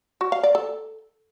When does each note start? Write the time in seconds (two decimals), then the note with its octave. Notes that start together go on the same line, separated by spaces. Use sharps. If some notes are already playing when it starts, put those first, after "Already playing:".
0.21 F#4
0.32 F5
0.43 D5
0.55 A4